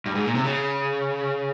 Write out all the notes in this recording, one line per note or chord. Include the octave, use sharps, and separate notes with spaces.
G2
G#2
A#2
C3
C#3